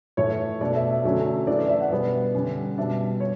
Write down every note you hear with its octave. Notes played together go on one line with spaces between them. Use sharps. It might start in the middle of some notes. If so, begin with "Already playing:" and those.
A2 E3 A3 C#5
B2 A3 D4 D5
E5
E5
D3 F#3 A3 C#4
E3 A3 D4 D5
D5
E5
F#5
B2 G3 B3
D3 G3 C#4
B2 G3 D4 E5
C#5